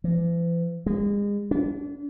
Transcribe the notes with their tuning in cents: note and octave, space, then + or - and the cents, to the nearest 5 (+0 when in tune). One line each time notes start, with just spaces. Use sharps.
E3 +45
G#3 -35
D4 -40